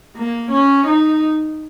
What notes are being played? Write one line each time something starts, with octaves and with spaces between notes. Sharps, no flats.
A#3
C#4
D#4